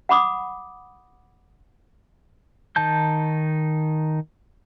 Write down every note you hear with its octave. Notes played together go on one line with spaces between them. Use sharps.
F#5 B5 D6 D#6
D#3 D#4 A5 G6